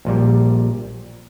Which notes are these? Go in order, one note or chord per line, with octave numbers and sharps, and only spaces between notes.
A#1 A#2 G3